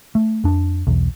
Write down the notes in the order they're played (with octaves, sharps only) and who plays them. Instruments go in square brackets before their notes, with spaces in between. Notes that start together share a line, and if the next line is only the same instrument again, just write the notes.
[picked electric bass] A3
F2 D4
B1 E2